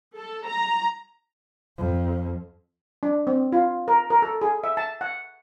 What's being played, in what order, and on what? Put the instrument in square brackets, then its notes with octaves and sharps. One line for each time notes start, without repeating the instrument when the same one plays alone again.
[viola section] A4
A#5
[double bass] F2
[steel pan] D4
C4
F4
A#4
A#4
A4
G#4
E5
A5
F#5